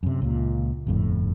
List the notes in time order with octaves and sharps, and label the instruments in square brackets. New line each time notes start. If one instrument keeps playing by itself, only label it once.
[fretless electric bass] F#2 C3
C#2 A#2
G1 F2 A2